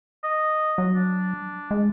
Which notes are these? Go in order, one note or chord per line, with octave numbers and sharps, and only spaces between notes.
D#5
F#3
D4
G#3